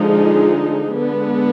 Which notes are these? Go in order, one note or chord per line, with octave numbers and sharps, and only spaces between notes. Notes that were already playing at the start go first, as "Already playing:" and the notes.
Already playing: D3 F3 G#3 D#4 G#4
D3 G#3 B3